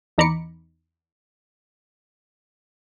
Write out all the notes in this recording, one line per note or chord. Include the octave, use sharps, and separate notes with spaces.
E2 D#4 A#5 B5 D6 C#7